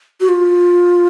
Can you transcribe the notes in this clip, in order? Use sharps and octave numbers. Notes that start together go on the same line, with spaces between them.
F#4
F4